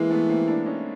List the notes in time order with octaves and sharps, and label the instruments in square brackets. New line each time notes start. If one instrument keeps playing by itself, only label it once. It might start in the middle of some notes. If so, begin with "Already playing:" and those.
Already playing: [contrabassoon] E3 [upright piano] G#3 A#3
[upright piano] A3 B3
A#3 C4
D4 E4
C#4 D#4